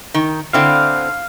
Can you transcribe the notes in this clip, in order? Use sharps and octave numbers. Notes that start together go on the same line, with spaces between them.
D#3
D3 C4 E4 F5